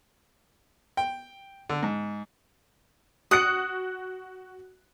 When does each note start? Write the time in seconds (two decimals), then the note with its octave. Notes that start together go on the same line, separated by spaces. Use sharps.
0.97 G5
1.69 D3
1.83 G#2
3.31 F#4 D#6 F#6 C#7